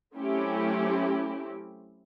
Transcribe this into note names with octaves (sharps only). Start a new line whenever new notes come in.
F#3 A3 C4 C#4 E4 G4